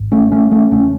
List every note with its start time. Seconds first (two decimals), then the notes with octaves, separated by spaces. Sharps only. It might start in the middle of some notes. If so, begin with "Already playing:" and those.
Already playing: G#1 G#2
0.12 A3 C#4
0.31 A3 C#4
0.51 A3 C#4
0.71 E1 E2 C#3 A3 C#4